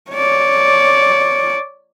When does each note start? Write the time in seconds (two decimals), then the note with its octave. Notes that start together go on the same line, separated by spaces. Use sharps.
0.11 C#5 D5